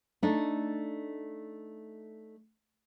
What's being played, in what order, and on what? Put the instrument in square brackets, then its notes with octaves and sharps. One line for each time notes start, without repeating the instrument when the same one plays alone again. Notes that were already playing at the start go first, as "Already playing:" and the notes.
[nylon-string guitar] A3 D4 D#4